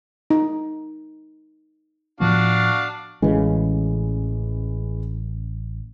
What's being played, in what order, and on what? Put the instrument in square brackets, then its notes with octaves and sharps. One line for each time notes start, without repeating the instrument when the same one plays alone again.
[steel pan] D#4
[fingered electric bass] A2 F3 B3 [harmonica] D4 F#4 F5
[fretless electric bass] A1 C#3 [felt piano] E3 G#3